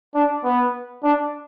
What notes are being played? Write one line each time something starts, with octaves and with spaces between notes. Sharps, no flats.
D4
B3
D4